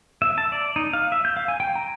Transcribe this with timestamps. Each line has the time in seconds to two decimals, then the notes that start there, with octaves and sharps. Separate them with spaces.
0.22 E5
0.38 A5
0.52 D5
0.76 D#4
0.93 F5
1.12 E5
1.25 G6
1.37 F5
1.48 G#5
1.60 G5
1.76 A#5